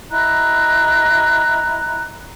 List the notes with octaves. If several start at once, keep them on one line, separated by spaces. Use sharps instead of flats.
E4 D#5 A#5 F#6